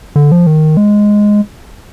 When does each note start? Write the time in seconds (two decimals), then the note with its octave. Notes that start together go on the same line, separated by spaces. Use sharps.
0.16 D3
0.32 F3
0.47 D#3
0.77 G#3